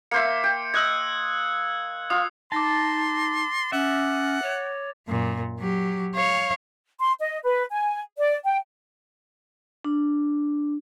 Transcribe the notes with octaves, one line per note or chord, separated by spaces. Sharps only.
A#3 C5 E5 C#7
G5
D#5 E6 F#6 G#6
F4 D#6
D#4 A5 C6 D6 A6 A#6
C#4 E5 F#5
C#5
F#2 A#2
F#3 G4
C#5 F5
C6
D#5
B4
G#5
D5
G5
D4